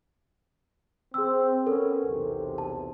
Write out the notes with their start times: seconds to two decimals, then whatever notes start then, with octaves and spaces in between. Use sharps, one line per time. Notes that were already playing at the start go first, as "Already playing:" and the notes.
1.14 C4 G#4 E6
1.66 B3 C#4 A4 A#4
2.04 B1 E2 C3
2.58 A5